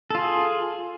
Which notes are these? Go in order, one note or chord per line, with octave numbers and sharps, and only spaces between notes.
F4 G#4 A4